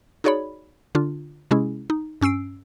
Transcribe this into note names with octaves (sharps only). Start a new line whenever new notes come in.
D#4 F#4 G#4 C#5 D5 B5
D3 D4 F4
C3 G#3 C#4 E4 G#4
D#4
G2 C#4 E6 C7 D7